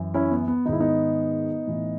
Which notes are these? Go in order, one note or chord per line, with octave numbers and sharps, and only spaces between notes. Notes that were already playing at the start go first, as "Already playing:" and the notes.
Already playing: F#2 E3
C#4 E4
B3
B3
G#2 D#3 D#4 E4
B3 D#4
A2 E3